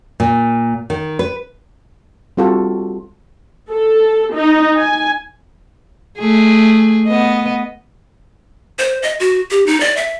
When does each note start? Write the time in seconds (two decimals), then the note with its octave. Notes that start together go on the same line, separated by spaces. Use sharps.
0.20 A#2
0.90 D#3
1.19 B4
2.37 G3 C4 F4 F#4 A4
3.72 A4
4.34 D#4
4.78 G#5
6.19 A3 G#4
7.07 B3 D#5
8.79 C5
9.02 D#5
9.20 F#4
9.51 G4
9.67 D#4
9.80 D5
9.97 E5